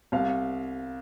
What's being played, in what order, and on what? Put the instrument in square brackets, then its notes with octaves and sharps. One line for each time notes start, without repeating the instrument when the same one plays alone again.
[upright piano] C2 F5